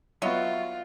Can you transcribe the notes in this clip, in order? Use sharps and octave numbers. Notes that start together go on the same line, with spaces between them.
F#3 B3 F4 C#5 D#5 E5